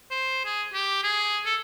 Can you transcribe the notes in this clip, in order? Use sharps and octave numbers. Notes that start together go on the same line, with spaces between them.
C5
G#4
G4
G#4
A4